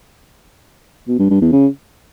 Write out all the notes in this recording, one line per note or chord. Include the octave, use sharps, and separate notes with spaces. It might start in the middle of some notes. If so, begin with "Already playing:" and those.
B2
G2
G2
E2
C#3